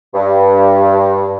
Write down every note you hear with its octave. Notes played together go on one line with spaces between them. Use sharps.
G2